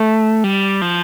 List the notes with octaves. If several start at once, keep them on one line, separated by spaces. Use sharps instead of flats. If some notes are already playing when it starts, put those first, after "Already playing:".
Already playing: A3
G3
F3